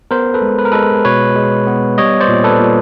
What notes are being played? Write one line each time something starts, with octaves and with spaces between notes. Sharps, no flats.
B3 A#4 C5
A4 B4
G#3
B4
A#4
G#3 A4 B4
B2 B4 C#5
G#3
B3
G3 C#5 D#5
C5 D5
A#2
A4 B4
A#2